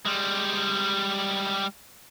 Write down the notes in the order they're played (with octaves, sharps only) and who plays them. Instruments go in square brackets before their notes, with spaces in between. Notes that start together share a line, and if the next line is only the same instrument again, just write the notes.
[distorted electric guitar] G3 G#3